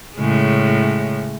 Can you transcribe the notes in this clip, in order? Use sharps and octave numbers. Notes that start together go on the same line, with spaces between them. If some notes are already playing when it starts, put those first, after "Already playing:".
A2 C#3 G#3